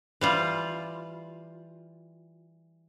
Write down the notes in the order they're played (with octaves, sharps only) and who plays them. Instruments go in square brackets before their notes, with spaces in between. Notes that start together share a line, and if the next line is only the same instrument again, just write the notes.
[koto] E3 G3 F4